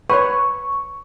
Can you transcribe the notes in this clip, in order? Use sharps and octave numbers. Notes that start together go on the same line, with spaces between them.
B4 C#5 C#6